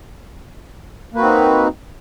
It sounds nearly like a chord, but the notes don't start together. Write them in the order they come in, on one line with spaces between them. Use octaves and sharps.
A#3 B4 F#4 C4 D#4